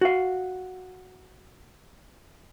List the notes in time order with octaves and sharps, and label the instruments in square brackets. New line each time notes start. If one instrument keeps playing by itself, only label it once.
[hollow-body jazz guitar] F#4 F5